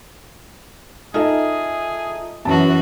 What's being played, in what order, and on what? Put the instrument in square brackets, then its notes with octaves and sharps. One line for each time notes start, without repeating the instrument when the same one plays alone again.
[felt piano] D#4 A4 D#5 [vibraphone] F4 E5 [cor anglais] G#4
[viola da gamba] F#2 E3 F#4 [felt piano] A5